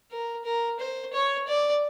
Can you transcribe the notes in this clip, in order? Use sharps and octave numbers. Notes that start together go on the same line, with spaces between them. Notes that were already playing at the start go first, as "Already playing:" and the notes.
A#4
A#4
C5
C#5
D5